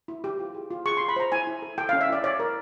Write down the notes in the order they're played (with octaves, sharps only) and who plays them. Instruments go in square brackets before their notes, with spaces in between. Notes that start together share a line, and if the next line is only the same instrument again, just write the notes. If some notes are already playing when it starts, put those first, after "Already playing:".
[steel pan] E4
G4
F4
G#4
F4
G#4 C#6
F4 C6
B5
C5 A#5
E4 G#5
E4
A4
A4 G5
C#4 F5
E5
E4 D5
C#5 D5
A#4